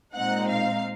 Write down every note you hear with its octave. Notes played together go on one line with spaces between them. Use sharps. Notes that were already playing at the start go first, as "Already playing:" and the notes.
A#2 G#3 C4 D#4 F#5
F5